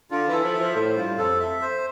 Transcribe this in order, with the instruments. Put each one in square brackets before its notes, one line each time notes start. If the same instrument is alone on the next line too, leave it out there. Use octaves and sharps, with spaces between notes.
[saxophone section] D3 [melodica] F4
[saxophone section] E3 [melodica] A4
[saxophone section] F3
[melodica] E5
[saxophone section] F3
[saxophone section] A2 [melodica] C5
[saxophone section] G2 [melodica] F4
[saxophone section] F2 [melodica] A4
[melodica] E5
C5